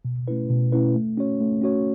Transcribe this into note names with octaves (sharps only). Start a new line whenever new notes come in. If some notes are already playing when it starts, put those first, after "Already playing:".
B2
A3 C#4 E4 B4
B2
A3 C#4 E4 B4
A3
C#4 F#4 C#5
A3
C#4 F#4 C#5